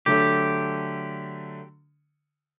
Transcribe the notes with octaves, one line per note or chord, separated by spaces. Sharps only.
D3 F#3 A3 G4